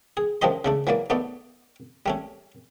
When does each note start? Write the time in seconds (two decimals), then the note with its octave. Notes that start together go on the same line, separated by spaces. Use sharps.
0.17 G#4
0.42 F#2 F3 D4 G4 D#5 C6
0.65 C#3 A3 D4
0.87 E3 F#3 A#3 D5
1.10 A3 B3 D#4 D5
2.06 G3 A3 C#4